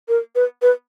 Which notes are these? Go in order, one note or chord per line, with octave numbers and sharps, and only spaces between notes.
A#4
B4
B4